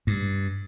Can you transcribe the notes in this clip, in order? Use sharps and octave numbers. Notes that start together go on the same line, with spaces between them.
G2